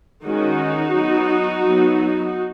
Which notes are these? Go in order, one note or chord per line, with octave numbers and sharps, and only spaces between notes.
D#3 G#3 C#4 D#4 F#4
F#3 B3
F#3 B3